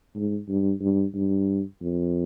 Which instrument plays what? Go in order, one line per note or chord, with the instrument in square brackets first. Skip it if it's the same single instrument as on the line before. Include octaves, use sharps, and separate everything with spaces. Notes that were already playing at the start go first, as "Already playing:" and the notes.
[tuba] G#2
G2
G2
G2
F2